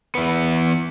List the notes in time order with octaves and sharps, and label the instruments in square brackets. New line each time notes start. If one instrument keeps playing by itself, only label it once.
[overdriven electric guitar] E3 B3